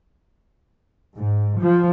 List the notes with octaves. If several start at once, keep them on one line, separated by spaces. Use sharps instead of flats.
G#2
F3